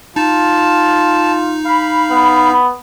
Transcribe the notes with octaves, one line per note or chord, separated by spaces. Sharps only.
D#4 F4 A5
F5 B5
B3